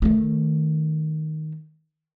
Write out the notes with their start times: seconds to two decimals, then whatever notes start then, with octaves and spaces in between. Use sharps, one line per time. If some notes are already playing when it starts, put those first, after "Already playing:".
0.02 D#3 A3